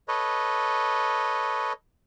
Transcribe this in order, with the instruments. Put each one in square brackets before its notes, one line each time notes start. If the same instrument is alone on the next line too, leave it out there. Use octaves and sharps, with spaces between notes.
[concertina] A4 B4 C#5 D#5